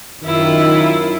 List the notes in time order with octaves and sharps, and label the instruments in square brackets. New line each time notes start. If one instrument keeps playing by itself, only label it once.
[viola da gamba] F#2 E4 F4 [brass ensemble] D#3